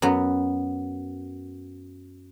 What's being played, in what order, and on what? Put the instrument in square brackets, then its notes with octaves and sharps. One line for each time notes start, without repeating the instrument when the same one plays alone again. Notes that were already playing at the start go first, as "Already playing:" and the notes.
[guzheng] F#2 B3